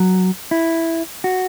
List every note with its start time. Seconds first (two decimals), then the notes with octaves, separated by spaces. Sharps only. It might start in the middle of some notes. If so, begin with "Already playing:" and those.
Already playing: F#3
0.51 E4
1.24 F#4